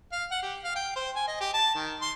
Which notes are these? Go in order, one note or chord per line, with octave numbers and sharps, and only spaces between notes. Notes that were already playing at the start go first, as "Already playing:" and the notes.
F5
F#5
G4
F5
G5
C5
G#5
D#5
G4
A5
D#3
C6